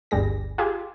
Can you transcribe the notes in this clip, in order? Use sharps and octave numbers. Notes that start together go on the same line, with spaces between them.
G1 D2 G2 G3 G#4 A#6
F4 G4 G#4 G#5